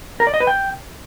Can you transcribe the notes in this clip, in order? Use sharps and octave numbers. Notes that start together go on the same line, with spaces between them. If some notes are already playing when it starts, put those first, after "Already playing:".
A#4
D5
D#5
B4
G5